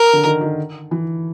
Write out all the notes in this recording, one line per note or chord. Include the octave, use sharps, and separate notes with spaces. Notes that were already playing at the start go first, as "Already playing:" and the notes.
Already playing: A#4
D3
D#3
D#3
E3